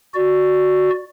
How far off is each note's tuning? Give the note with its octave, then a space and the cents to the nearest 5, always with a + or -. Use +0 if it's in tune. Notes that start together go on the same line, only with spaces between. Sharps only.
F#4 +0 D5 +5